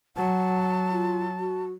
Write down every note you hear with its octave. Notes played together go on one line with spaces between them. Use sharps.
F#3 F#5 A5
F4
F#4